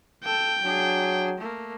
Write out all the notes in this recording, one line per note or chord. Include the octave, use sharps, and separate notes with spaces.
A4 G5
F#3 D4 G#4
A3 A#3